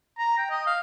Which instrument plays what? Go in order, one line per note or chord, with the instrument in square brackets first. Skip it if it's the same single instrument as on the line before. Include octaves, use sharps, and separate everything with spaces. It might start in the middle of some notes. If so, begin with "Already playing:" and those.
[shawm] A#5
G5
D#5
F5